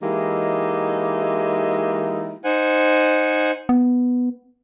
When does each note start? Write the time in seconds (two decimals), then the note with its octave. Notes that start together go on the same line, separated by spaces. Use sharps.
0.03 E3 G#3 A#3 D#4 E4 G4
2.43 D#4 C5 F#5 G#5
3.69 B3